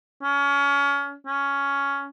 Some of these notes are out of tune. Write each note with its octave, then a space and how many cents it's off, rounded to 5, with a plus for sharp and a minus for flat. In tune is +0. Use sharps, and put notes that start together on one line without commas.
C#4 +25
C#4 +10